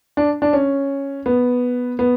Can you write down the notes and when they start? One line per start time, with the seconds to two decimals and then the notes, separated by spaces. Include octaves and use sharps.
0.17 D4
0.42 D4
0.53 C#4
1.26 B3
1.99 B3